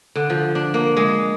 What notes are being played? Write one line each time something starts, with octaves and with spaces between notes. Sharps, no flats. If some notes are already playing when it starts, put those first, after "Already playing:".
D3
F3
D4
A#3
G#3